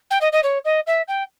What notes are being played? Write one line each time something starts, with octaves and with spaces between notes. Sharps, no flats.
G5
D#5
D#5
C#5
D#5
E5
G5